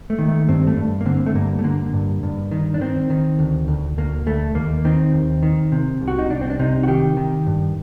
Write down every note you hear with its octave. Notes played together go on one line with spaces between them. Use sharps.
A3
D#3
A3
G2 C4
A3
G2
A#3
D3 C4
A3
G2 A#3
A3
D3 A#3
G2
G2
D#3
D4
D#3 C4
D#3
D2
D2
D2 A#3
D2 A3
D#2 A#3
D#3 C4
D#2
D#3
C3
C2
F#4
D#4
C2 D4
C4
D4
C3 D#4
F#4
D#3 G4
D#3
G2